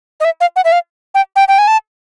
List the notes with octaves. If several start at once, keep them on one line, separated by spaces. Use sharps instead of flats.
D#5
E5
F5
F#5
E5
F5
G5
G5
G5
G#5
A5